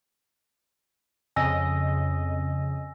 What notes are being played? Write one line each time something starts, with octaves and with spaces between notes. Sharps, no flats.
F2 C#3 D#5 G#5 E6 A#6